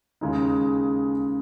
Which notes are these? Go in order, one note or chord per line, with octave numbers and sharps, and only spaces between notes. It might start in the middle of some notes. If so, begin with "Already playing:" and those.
D#2 C#3 G#3 D#4